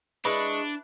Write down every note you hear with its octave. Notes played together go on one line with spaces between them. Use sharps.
G#3 D4 E4 B4 C#6